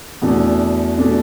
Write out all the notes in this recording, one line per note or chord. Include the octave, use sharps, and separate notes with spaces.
E2 B2 A3 D4 A4
B2 A3 D4 A4